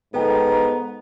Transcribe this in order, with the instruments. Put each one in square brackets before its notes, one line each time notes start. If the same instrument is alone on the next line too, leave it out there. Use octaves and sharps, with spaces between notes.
[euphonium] G#2 [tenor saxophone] B3 [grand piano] A4 G5 [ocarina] A#5